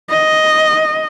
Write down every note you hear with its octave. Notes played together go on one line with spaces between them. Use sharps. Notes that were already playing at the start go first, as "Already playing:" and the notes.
D#5